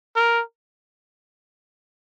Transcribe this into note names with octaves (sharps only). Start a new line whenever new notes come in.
A#4